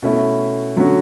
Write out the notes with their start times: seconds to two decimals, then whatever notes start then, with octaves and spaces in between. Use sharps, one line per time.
0.02 B2 A3 C#4 E4
0.76 D3 F#3 A3 C#4 F#4